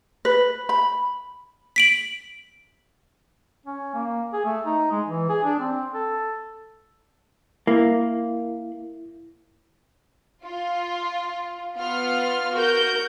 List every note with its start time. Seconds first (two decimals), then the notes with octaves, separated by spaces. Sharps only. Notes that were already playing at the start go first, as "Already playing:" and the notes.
0.25 B4
0.69 B5
1.76 B6 D7 F#7
3.66 C#4
3.94 A#3
4.33 G#4
4.45 A3
4.65 D#4
4.91 G#3
5.06 E3
5.29 G#4
5.44 D4
5.59 C4
5.94 A4
7.67 A#3 E4
10.44 F4
11.77 B3 F4 F6
12.54 F#4 A#4 G6